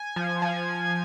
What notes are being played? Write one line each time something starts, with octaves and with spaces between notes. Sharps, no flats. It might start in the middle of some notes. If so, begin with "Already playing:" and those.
Already playing: G#5
F3
F3